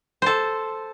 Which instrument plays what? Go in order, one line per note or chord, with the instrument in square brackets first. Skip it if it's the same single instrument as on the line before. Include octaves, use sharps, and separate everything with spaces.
[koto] A4 C5